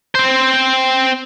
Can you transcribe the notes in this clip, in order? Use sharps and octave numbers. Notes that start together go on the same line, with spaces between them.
C4 C5